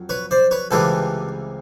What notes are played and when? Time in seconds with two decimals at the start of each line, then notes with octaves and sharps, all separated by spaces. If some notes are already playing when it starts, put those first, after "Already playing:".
Already playing: F2 F#3
0.09 B4 C#5
0.31 C5 D5
0.51 B4 C#5
0.71 C#2 C3 E3 G3 A#3 A4 B4